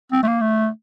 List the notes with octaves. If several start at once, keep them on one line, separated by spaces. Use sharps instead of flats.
C4
A3
A#3
A3